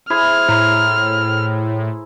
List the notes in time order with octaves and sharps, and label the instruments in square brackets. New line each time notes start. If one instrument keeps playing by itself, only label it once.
[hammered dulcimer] E4 G#4 C5 [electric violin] F6
[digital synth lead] A2 [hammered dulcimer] A#5 C6